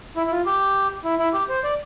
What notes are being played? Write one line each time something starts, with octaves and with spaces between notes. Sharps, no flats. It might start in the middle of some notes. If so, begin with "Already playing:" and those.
E4
E4
F4
G4
E4
E4
G4
C5
D5